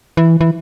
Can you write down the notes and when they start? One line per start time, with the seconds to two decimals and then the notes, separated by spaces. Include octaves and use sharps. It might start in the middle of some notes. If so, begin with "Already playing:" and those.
0.17 E3
0.41 E3